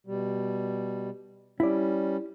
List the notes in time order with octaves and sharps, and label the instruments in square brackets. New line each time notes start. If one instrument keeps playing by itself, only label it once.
[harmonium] B2 G3
[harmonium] G3 C#4 [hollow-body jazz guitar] E4 D5